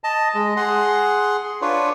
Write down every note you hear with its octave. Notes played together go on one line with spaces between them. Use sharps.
D#5 A5
G#3 D#5
G#4 F#5 C6
D4 F4 B4 C#5